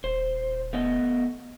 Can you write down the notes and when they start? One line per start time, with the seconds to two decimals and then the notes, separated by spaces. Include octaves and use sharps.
0.04 D#1 C5
0.73 A3 B3 D#5